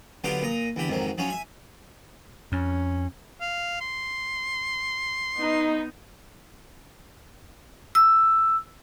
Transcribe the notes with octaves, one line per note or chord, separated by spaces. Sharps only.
D3 F#3 B3 F4 G4 D6
A#2 A#5 D#6
E2 D3 G4 B5
F2 G#2 D#3 F#3
F3 F#3 C#4 C#5
E5 G#5
F2 C#4
F5
C6
B3 D#4
E6